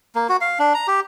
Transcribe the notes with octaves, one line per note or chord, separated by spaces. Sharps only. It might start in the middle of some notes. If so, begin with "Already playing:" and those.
A#3
F#4
F5
D4
A#5
G4